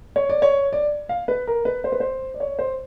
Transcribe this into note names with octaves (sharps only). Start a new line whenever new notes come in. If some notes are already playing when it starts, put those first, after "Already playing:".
C#5
D5
C#5
D5
F5
B4
A#4
B4
C5
B4
C5
D5
C#5
C5